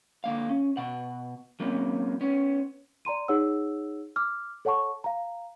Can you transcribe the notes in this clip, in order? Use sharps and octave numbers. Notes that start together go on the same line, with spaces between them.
D3 A#3 F5
C#4
B2 F#5
F#3 A#3 C4 C#4
B3 C#4
D5 A#5 C6 D#7
D#4 G#4 C#5 F#5 E6
D6 F6
A4 C#5 F#5 A5 C#6
F5 A#5